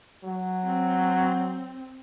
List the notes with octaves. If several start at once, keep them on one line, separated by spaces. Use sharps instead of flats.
F#3
C4